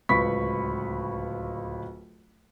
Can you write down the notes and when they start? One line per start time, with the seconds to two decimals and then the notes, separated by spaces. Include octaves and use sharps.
0.09 D1 C#2 B4 B5 C#6 B6